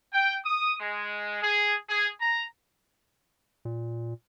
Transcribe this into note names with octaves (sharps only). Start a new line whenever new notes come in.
G5
D#6
G#3
G#4
G#4
A#5
A#2